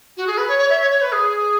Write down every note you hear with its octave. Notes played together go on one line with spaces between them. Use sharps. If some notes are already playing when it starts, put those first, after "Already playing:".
F#4
G#4
B4
C#5
C#5
E5
C#5
C#5
B4
G#4